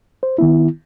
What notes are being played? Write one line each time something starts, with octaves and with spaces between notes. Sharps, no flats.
C5
D#3 B3 E4